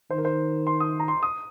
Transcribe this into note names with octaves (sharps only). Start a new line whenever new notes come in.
D#3 C5
A#4
C5
C6
D#6
A#5
C6
D#6